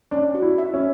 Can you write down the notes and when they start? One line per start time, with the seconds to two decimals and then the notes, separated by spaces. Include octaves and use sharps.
0.11 C#4 D4
0.34 F#4
0.42 E4
0.58 E5
0.74 C#4